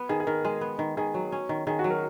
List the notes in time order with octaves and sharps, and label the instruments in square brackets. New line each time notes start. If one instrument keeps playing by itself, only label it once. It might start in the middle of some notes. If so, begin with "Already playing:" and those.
Already playing: [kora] B3
[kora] D#3 [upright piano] G#4
[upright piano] G#4
[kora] D#3 [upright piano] A#4
[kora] G#3
B3
D#3
[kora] D#3 [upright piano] G#4
[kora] F#3
C#4
D#3
[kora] D#3 [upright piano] G#4
[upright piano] F#4
[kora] F#3
[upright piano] A#4